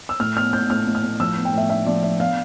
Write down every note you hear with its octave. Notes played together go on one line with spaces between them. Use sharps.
E6
A2 F6
B3 F6
A2 G6
A2 F6
A2
F6
A2
F3 E6
B3
G5
A2 E5
D4 E5
F3 D5
D4 E5
B3 F5